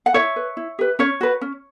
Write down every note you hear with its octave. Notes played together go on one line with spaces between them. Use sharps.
F#5
E4 C#5 E5
B4
E4
G4 B4
C#4 C#5
F#4 B4
C#4